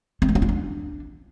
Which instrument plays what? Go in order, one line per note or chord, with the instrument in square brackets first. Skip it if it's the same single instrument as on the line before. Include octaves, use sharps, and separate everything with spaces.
[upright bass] C4
A3
C4
E4
D4